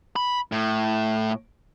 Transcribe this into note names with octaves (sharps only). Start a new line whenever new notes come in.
B5
A2